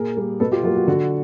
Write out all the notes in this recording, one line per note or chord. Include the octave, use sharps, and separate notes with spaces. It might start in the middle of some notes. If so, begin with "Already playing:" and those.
Already playing: A#2 G#4 A#4
G3 A#3
B2 A4 B4
F4 G4
F#3 A#3 F4 G4
F#4
D3 F#4